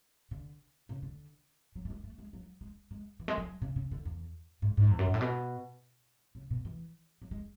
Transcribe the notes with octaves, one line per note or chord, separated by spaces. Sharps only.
D3
C#3
D3
F#3
A3
G#3
A3
G#3
F#3
G#3
G#3
E3
G#3
F#3
C#3
C#3
D3
E2
G#2
G#2
E2
F#2
G#2
A2
B2
C#3
B2
E3
F#3
G#3